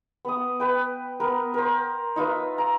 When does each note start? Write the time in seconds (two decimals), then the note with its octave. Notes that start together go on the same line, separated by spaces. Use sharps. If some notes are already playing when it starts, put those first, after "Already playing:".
0.25 B3 D#6
0.60 B4 G5
1.20 B3 A#4
1.54 A#4 C5
2.16 D#4 F4 B4 E5
2.58 A#5